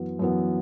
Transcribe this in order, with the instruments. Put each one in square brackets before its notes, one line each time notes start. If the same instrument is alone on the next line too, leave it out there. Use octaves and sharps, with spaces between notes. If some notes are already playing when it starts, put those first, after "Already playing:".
Already playing: [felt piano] F#2 E3 B3
F#2 E3 B3